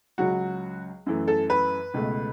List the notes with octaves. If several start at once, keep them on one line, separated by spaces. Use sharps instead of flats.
C#2 C#3 F#3 F#4
F#2 E3 A3
A4
B4
C#2 B2 A3